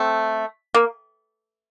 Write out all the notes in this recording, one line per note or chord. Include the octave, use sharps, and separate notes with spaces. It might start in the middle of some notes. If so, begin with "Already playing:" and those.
Already playing: A3 C4
A#3